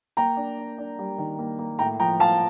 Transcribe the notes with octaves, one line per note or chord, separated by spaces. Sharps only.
A#3 G5 A#5
D4
D4
D4
G3
D#3
A#3
A#3
A2 G5 A#5
F3 G5 A#5
F3 F5 A5